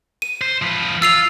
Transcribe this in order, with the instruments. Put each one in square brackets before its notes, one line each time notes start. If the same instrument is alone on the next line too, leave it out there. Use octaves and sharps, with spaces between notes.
[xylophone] D#7
[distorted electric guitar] C5
F3 B4
[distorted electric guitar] F4 [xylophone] E6 C7 F7